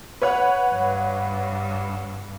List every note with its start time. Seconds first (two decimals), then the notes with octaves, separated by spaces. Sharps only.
0.22 B4 C#5 F#5
0.73 G2